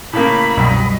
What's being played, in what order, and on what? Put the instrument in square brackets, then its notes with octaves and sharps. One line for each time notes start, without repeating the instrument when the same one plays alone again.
[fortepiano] A2 C#3 A#3 [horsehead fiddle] B5
[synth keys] C2 F#2 B2 [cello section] F#3 G3 D#5